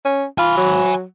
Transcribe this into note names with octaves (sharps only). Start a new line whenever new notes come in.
C#4
F4 G#5 B5
F#3